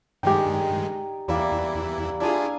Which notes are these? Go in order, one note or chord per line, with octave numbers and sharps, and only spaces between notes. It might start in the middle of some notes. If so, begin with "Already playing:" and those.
G2 D#3 G#3 D#4 G4 D5 G5 G#5
E2 E3 G3 A#3 E4 D5
D4 E4 F4 G#4 G#5